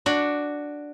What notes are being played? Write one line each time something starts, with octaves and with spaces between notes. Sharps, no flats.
D4 F#4